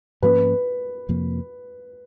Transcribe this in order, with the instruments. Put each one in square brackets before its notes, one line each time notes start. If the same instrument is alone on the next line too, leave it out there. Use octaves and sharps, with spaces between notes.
[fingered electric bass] G#2 F3 A#3 C#4 [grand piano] B4
[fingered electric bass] F2 C3 F3 A#3